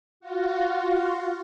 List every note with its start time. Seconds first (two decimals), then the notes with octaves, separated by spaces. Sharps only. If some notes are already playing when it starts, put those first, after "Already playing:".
0.20 F4 F#4